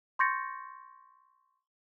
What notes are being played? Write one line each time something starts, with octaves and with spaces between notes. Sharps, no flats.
C6 C#6 G6 A6 A#6 C#7